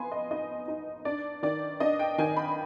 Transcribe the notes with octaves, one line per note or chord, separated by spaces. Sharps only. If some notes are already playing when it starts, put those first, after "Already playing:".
Already playing: F3 B3 G#5 B5 C6
D#5
D#4 D#5
D#4
D4 D5
D#3 D5
D4 D#5
G5
D#3 G#5
B5